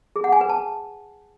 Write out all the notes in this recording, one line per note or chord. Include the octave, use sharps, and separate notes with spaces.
G#4
F#5
G#5
B4
A5